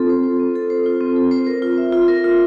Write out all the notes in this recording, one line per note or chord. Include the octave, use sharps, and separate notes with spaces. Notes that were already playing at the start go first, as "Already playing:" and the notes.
Already playing: C4 F4 A4
C5
F4
C4
A4
C5
F4
C4
A4
C5
A#4
F4
E5
F4
A#4
F4